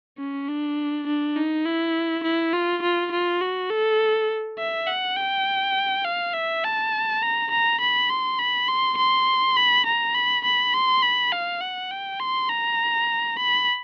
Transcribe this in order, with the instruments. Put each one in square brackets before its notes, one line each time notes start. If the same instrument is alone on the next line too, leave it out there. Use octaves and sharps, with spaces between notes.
[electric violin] C#4
D4
D4
D#4
E4
E4
F4
F4
F4
F#4
A4
E5
F#5
G5
F5
E5
A5
A#5
A#5
B5
C6
B5
C6
C6
B5
A#5
B5
B5
C6
B5
F5
F#5
G5
C6
A#5
B5